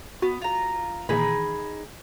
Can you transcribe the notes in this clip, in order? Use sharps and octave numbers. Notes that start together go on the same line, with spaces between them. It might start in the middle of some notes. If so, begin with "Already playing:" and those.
B3 F#4
F4 A#5
A#2 D#3 E3 D#4 G#4 B5